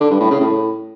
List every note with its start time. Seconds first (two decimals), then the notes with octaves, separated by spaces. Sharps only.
0.01 D3
0.11 G2
0.21 A2
0.31 C#3
0.41 A2